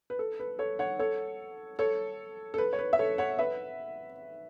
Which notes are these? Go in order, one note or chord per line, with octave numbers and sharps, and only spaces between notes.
B4
A4
B4
A4 C#5
C#5 F#5
A4 C#5
A4 C#5
A4
B4
C#5
B4
E5
A4 C#5
C#5 F#5
B4 E5